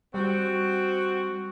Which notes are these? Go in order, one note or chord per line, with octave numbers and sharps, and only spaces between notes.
G3 C4 F#4